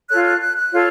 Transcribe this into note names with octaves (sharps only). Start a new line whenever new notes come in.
F4 A4 C#5 F#6
F#6
F#6
F#6
F4 A4 C#5